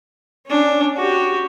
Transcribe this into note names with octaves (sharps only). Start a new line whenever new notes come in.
C#4 D4
F#4 G4